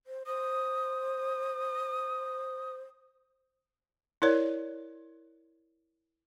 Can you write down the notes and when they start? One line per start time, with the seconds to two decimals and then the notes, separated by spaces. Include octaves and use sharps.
0.07 C5
0.26 C5 D#6
4.22 E4 A#4 C#5 D5